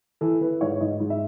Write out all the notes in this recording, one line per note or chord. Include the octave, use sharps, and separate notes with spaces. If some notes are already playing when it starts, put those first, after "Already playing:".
E3 A4
E3 B4
G#2 C#5
G#2 D#5
G#2
E5